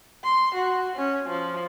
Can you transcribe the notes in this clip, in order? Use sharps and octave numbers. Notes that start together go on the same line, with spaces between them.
C6
F#4
C#4
F3